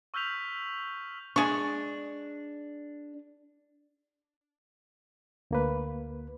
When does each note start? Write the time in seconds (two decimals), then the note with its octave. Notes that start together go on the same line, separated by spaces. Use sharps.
0.14 C#6 E6 F6 G6 B6 F7
1.36 G#3 D4 C#6
5.51 D2 A#3 B4